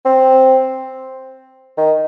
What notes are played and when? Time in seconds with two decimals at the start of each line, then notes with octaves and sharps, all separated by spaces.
0.05 C4
1.78 D#3